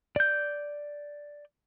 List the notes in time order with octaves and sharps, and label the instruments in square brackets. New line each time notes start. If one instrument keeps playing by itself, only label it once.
[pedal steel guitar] D5 G6